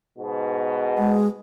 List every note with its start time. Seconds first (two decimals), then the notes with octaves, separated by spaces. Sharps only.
0.18 G#2 B2
0.98 G#3